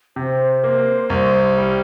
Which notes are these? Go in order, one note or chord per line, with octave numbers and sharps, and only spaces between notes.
C3 C5
A#3
C2
G3